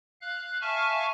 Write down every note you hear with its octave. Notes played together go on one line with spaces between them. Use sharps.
F5 F#6
E5 F5 G#5 A5 C#6 F6